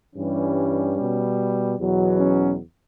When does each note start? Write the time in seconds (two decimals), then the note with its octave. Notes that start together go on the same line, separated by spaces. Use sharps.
0.15 G2 E3 G3 C#4
0.97 B2 G3
1.77 E2 B2 F#3
2.18 C#4